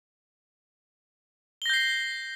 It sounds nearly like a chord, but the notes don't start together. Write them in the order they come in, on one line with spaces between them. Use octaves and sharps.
G7 A#6 G6 C7